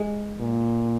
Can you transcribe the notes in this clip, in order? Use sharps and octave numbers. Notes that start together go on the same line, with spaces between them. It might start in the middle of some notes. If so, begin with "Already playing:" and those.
Already playing: G#3
A#2